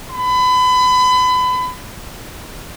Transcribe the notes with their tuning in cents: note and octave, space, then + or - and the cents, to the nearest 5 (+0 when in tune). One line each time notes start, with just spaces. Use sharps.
B5 +30